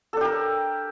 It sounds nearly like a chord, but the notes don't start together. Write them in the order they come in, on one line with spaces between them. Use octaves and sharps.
A4 D4 G4 A#4